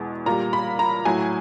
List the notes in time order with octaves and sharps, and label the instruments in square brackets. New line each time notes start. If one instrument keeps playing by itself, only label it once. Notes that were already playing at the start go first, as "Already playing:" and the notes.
Already playing: [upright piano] E2 B2 G#3
A#2 G3 A#5
B5
A#5
A2 F#3 G#5